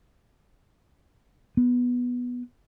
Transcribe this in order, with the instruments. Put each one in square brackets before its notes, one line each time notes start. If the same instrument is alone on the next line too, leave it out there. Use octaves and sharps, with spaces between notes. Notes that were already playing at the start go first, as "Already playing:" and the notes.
[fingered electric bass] B3